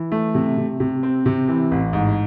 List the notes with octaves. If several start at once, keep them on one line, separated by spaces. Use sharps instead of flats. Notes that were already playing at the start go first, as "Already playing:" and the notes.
Already playing: E3
A3
C3
C3
C3
C4
C3
E3
A1
G#2